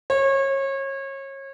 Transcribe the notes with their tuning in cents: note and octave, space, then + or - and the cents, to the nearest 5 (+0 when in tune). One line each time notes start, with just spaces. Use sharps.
C#5 -30